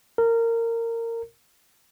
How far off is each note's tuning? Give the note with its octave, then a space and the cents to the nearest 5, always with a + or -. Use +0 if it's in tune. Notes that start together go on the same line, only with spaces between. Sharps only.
A#4 -20